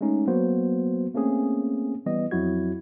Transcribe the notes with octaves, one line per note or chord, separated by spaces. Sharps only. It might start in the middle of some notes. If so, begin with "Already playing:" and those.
G#3 A3 C#4 D#4
F#3 A#3 B3 F#4 C5
A3 A#3 C4 C#4 G#4
E3 G3 B3 D#5
F2 F#3 E4 F#4 G#6